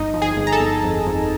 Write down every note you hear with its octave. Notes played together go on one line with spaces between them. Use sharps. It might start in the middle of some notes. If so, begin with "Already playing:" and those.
Already playing: G1 D#4 D#5
F3
G#4 G#5
G1
A#5
A4 A5
G1
F2
F2